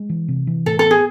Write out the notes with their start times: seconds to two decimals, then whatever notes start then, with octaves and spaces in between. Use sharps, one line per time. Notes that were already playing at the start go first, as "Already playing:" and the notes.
Already playing: G#3
0.09 E3
0.28 C3
0.47 E3
0.66 A2 A4
0.79 A4
0.85 B3
0.91 G#4